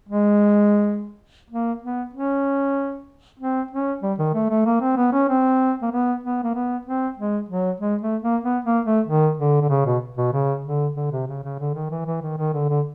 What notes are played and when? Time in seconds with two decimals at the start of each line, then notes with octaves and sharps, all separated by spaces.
0.09 G#3
1.50 A#3
1.82 B3
2.13 C#4
3.39 C4
3.71 C#4
4.02 G3
4.18 D#3
4.34 A3
4.49 A3
4.65 A#3
4.81 C4
4.97 B3
5.13 C#4
5.28 C4
5.82 A#3
5.91 B3
6.23 B3
6.43 A#3
6.55 B3
6.85 C4
7.17 G#3
7.49 F#3
7.80 G#3
8.01 A3
8.22 A#3
8.43 B3
8.64 A#3
8.85 A3
9.07 D#3
9.37 D3
9.61 D3
9.69 C#3
9.86 B2
10.17 B2
10.33 C#3
10.64 D3
10.96 D3
11.11 C3
11.27 C#3
11.43 C#3
11.59 D3
11.74 D#3
11.90 E3
12.06 E3
12.22 D#3
12.38 D#3
12.53 D3
12.69 D3